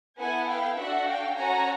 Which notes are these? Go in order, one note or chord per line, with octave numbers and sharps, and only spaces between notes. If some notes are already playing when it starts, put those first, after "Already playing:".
B3 E4 A4 F#5 G#5
F5 G5
D4 F#4 A4 E5 F#5
F5 G5
C#4 F#4 A4 G#5 A#5